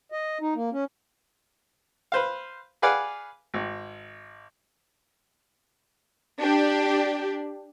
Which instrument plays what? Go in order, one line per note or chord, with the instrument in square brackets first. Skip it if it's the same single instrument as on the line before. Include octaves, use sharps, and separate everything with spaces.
[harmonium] D#5
D#4
A#3
C#4
[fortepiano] B4 C5 F5
G#4 B4 D5 F5 F#5 G#5
G#1
[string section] D4 G4